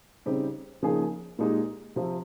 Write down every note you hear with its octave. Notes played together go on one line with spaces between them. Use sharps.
C#3 G3 C4 D#4 G4
C#3 F3 A#3 D#4 G#4
A#2 G#3 D#4 G4
C3 F3 C4